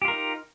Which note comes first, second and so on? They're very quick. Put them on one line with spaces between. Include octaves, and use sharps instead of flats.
G4 F4 A#4 D#4